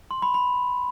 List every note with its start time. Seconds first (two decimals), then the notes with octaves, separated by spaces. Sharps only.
0.11 C6
0.22 B5
0.34 B5